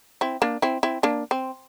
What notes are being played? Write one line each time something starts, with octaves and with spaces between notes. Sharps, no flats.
C4 E4
A#3 D4
C4 E4
C4 E4
A#3 D4
C4